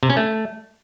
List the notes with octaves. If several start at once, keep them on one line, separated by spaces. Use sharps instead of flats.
C3
C#4
A3